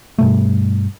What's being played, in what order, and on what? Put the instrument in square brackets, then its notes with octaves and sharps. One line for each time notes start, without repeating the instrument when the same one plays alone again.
[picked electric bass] G2 B2 A3